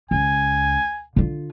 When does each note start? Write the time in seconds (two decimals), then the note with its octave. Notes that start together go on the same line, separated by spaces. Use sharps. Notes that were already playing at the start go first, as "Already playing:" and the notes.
0.11 C#2 G#5
1.16 D3 F4